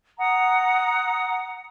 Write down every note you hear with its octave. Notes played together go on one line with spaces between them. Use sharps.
F#5 A#5 D#6